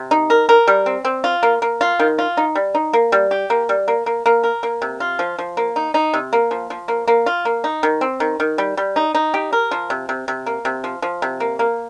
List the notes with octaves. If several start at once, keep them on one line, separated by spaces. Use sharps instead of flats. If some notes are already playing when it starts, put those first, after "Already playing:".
Already playing: C3
D#4
A#4
A#4
G3
C4
C4
F4
A#3
A#3
F4
D#3
F4
D#4
G3
D#4
A#3
G3
G4
A#3
G3
A#3
A#3
A#3
A#4
A#3
C3
F4
F3
F3
A#3
D#4
D#4
C3
A#3
F3
F3
A#3
A#3
F4
A#3
D#4
D#3
C4
D#3
D#3
G3
G3
D#4
D#4
G4
A#4
F3
C3
C3
C3
A#3
C3
F3
F3
C3
A#3
A#3